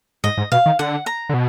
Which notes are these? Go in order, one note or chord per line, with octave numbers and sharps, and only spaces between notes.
G#2 D#5
G#2
B2 F5
D#3
D3 F#5
A#5
D3
B2